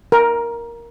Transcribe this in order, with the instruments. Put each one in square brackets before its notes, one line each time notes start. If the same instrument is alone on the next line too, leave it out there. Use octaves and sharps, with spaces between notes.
[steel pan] A#4